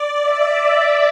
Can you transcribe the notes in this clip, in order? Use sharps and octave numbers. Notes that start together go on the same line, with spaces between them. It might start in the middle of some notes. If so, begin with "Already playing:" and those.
Already playing: D5
E5